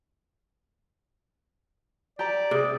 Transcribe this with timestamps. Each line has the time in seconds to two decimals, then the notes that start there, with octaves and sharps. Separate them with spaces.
2.19 G4 D5 A#5
2.51 C3 G#4 D#6